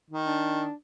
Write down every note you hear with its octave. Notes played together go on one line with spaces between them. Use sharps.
D#3
D4